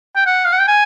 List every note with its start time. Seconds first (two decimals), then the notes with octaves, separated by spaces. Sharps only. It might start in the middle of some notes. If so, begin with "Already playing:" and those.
0.16 G5
0.26 F#5
0.45 F5
0.53 F#5
0.60 G5
0.67 G#5